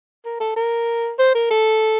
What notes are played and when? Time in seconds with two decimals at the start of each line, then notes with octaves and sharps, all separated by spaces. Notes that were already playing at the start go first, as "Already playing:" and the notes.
0.25 A#4
0.40 A4
0.56 A#4
1.19 C5
1.35 A#4
1.50 A4